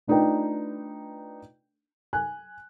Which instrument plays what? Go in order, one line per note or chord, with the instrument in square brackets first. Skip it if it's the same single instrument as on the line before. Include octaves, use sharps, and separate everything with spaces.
[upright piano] A3 D4 D#4 F4 B4 G5
G#5 F#6